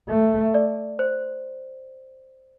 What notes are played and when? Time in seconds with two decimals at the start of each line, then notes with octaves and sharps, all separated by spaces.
0.09 A3
0.54 D5
0.99 C5